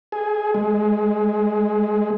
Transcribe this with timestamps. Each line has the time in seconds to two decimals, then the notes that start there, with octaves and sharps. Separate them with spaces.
0.12 G#4
0.54 G#3